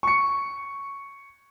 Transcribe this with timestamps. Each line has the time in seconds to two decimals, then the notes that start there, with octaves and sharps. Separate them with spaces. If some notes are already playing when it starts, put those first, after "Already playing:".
0.03 C#6 C#7